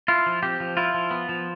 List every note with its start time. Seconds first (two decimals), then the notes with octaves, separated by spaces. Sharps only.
0.08 E4 F4
0.26 F3
0.43 C4 G4
0.60 F3
0.77 E4 F4
0.94 F3
1.11 B3
1.29 F3